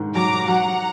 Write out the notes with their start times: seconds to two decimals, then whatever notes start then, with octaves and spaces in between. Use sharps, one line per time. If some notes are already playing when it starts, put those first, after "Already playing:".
Already playing: G#2 D#3
0.15 F#3 A#5 D6
0.48 F#3 F#5 A#5